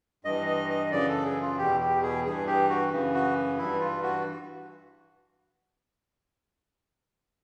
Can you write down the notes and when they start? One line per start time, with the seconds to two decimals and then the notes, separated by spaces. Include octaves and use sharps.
0.25 G2 E3 D#5
0.47 D#5
0.70 D#5
0.91 F#2 C#3 E3 D5
1.08 A4
1.25 G#4
1.41 F4
1.58 E2 B2 G4
1.80 G4
2.03 G#4
2.24 G2 E3 G#4
2.47 G4
2.69 F#4
2.92 F#2 C#3 E3
3.14 F#4
3.58 G2 E3 E4
3.80 F4
4.03 F#4